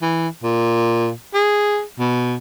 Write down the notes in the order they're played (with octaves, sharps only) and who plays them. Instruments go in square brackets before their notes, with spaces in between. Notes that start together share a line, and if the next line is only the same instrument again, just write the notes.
[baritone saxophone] E3
A#2
G#4
B2